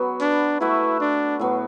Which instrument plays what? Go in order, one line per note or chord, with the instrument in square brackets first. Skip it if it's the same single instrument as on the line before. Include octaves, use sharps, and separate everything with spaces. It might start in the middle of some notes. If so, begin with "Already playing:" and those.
Already playing: [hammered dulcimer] F#3 B3 F#4 B4
[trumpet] D4
[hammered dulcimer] A3 F#4 B4 E5 [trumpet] E4
[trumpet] D4
[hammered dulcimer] A2 F#3 B3